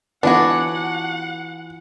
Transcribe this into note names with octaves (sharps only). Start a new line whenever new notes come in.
E3 B3 D4 F4 F#4 C#5 F#5